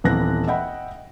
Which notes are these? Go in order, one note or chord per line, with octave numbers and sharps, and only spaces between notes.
D#1 E3 B3 C4 F#6 A#6
D#5 E5 F#5 G5 B5